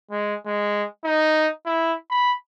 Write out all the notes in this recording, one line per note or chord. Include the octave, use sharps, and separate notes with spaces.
G#3
G#3
D#4
E4
B5